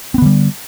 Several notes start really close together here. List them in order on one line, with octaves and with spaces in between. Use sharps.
C4 B3 D3 G3